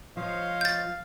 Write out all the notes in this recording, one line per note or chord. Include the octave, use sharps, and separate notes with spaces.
F3 C5 C#5 D#5 F5
G6 A6